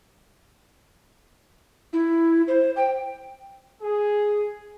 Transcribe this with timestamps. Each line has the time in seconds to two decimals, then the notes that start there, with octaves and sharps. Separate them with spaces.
1.93 E4
2.48 C5
2.76 G5
3.82 G#4